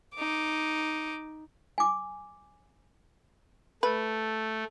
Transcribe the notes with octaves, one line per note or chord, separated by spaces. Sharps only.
D#4 D6
G#5 D6
A3 B4